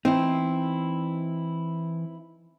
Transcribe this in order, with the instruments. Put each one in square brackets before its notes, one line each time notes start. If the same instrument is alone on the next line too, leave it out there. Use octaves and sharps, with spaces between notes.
[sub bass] E3 [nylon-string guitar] C4 [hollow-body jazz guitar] D#4 E4